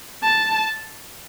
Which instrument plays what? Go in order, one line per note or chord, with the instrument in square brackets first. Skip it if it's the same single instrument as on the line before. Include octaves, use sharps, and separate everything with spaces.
[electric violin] A5